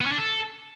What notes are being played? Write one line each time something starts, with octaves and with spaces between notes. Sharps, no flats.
B3
C#4
D4
A4